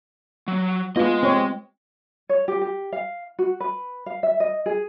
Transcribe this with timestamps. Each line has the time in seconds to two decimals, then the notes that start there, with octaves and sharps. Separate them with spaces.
0.48 F#3
0.96 G#3 B3 F4 D#5
1.23 C4 C#5
2.29 C#5
2.48 G4
2.62 G4
2.92 F5
3.39 F#4
3.60 B4
4.06 F5
4.23 E5
4.40 D#5
4.66 G#4